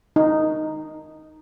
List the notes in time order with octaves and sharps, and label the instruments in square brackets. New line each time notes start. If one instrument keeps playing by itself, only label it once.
[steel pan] D#4